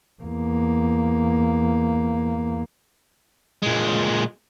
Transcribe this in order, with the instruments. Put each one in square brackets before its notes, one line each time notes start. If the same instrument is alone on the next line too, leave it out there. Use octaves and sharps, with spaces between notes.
[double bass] E2 A#3
[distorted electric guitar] A#2 G#3